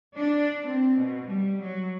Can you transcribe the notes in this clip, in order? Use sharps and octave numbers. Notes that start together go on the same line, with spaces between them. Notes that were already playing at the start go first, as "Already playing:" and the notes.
D4
C4
B2
G3
F#3